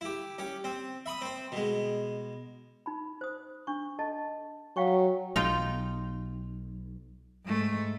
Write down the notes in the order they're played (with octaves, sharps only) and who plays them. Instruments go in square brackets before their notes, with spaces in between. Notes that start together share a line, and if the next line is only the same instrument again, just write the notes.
[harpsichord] E4 G4
C#4 G4
C4
E5 B5 C6 D#6
C4 C5
B2 G#3
[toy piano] D#4 B5
C5 D#6
D4 C#6
A4 D#5 A5
[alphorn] F#3 [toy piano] F5 G5 C#6
[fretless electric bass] B1 [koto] D#4 F4 G5
[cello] G#2 A3